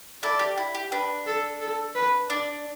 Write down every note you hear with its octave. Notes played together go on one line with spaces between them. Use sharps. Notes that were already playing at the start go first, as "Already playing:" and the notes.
E4 A4 D5
G4
E4
G4
D4 B4
A4
A4
B4
D4 D5